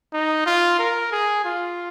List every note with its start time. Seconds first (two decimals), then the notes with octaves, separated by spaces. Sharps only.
0.13 D#4
0.46 F4
0.79 A#4
1.12 G#4
1.45 F4